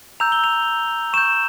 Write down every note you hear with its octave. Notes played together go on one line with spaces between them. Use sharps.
A#5 E6 G6 F7
G7
F7
C#6 G6 E7